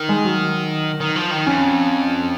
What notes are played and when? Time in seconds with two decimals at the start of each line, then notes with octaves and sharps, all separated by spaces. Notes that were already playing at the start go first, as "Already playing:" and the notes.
Already playing: D#3
0.09 G#3
0.25 F#3
1.00 D#3
1.16 F3
1.31 D#3
1.46 F2 C#4